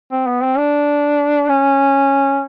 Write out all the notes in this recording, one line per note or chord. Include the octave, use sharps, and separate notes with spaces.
C4
B3
C4
D4
C#4